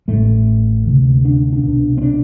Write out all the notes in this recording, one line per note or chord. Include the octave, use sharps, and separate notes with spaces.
A1 A2 A3
D2 C3
D4
D4
C2 B2
C4
D4